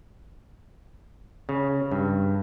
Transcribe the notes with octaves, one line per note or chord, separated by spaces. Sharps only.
C#3
G2